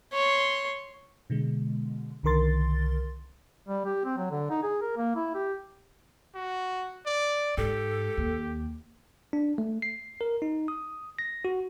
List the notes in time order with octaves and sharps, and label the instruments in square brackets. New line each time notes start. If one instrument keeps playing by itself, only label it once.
[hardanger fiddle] C#5 C6
[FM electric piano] B2 D3 G#3
C2 D3 D#3 A#4 C6 A6
[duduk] G3
G4
C4
F#3
D3
D#4
G#4
A#4
A#3
E4
G4
[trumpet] F#4
D5
[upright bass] G#2 [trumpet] G4 [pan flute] A4
[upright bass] D#2
[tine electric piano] D4
A3
C7
A#4
D#4
D#6
A#6
F#4